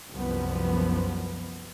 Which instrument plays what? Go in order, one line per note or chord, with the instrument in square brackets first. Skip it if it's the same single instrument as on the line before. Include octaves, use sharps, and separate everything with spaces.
[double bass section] C2 F#2 F3 B3